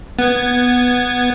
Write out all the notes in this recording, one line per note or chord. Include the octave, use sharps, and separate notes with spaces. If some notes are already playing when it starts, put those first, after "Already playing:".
B3 G#6